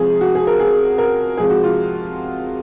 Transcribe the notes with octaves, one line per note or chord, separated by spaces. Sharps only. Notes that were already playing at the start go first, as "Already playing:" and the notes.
Already playing: C3 F3 G#3 G#4
F#4
G#4
A#4
G#4
A#4
C3 F3 G#3 G#4
F#4
F4